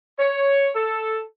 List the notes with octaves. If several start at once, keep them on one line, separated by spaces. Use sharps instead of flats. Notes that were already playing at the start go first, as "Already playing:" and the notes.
C#5
A4